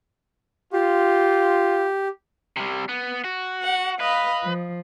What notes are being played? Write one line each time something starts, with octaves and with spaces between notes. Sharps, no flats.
F4 G4
C3 G3
B3
F#4
F#5
B4 D#5 F5 B5
F3